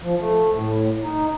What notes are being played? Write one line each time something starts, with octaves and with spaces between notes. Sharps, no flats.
F3
A3
A2
D#4